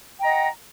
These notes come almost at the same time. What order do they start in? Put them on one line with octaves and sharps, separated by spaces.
G5 A#5 D#5 F#5